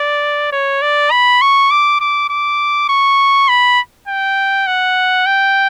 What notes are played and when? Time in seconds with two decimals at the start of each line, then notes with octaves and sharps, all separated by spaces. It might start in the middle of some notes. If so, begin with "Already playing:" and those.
Already playing: D5
0.52 C#5
0.82 D5
1.11 B5
1.41 C#6
1.71 D6
2.00 D6
2.29 D6
2.89 C#6
3.49 B5
4.08 G5
4.67 F#5
5.26 G5